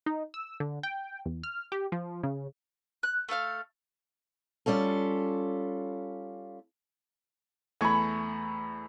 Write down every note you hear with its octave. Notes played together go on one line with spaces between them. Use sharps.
D#4
E6
D3
G5
E2
F6
G4
F3
C#3
F#6
A3 A4 F5 F6
G3 C#4 F4 A4
E2 A3 G#5 B5 C#6